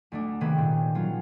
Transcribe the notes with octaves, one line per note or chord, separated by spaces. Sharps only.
D2 A3 D4
C3 D#3 A#3 C#4 G#4 B4
A#2 C4
F#3 C#4 F4